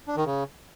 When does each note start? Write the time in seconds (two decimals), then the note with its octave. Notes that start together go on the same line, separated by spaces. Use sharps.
0.08 D4
0.16 D#3
0.25 C#3